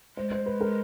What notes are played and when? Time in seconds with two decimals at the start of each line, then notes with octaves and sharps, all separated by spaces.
0.17 G#3 C5
0.32 C5
0.46 B4
0.61 A#4